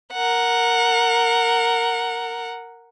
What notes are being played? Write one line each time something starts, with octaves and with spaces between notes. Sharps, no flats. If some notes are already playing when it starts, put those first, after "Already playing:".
A#4 F#5